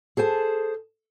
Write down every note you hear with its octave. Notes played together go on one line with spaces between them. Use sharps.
G#4 A4 C5 G#5 A5